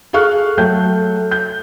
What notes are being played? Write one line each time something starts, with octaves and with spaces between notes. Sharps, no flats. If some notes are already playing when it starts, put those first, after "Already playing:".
G#4 A4 F5 C#6 F6 F#6
F#3 A3 G5 G6
G6